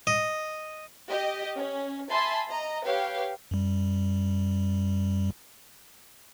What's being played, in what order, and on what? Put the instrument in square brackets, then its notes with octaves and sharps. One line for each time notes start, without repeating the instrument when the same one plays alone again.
[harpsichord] D#5
[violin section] G4 D#5
C#4
E5 G#5 A5 B5 C6
D#5 A#5
G4 B4 C#5 F5
[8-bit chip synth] F#2 G3